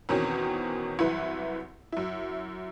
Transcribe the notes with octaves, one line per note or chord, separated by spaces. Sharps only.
E2 B2 D#3 C4 C#4
C2 F#2 E3 E4 B4
F#2 E4